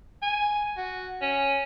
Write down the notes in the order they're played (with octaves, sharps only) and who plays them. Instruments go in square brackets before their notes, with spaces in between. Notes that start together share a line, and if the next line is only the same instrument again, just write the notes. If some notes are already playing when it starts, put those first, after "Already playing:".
[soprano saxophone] G#5
F#4
C#4